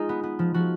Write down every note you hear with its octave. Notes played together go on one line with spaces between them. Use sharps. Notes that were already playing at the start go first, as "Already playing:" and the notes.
Already playing: G#3 D#4 F4
B3
B3
F3
F3 F#4